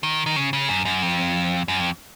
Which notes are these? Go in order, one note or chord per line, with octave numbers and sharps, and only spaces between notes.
D#3
D#3
C#3
C#3
F#2
F#2
F2
F#2
F2